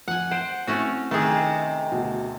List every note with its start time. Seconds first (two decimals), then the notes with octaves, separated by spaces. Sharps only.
0.08 F2 F#5 G#5
0.31 C5 F#5 D7 E7
0.67 A3 C4 C#4 E4 F#4
1.11 C3 D#3 A3 G#4
1.92 D2 B2